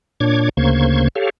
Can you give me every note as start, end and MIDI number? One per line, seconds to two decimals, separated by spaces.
0.20 0.49 46
0.20 0.49 62
0.20 0.49 73
0.20 0.49 86
0.20 0.49 92
0.57 1.08 38
0.57 1.08 49
0.57 1.08 58
0.57 1.08 72
0.57 1.08 85
0.57 1.08 92
1.15 1.30 67
1.15 1.30 69
1.15 1.30 73
1.15 1.30 77